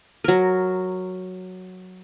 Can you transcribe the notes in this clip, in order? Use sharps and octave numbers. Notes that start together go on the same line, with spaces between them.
F#3 A#4